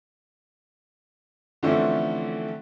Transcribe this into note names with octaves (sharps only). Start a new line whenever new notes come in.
D3 E3 F3 A3 C4 C#4